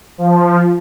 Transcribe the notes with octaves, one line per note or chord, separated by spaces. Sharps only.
F3